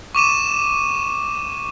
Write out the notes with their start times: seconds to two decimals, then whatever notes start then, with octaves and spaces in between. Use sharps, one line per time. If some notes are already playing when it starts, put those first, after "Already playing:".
0.15 C#6 D6 D#7 E7